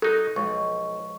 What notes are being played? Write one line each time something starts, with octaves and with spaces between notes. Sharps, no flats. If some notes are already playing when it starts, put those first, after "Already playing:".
F#3 D#4 A4
B1 F3 G#3 C#6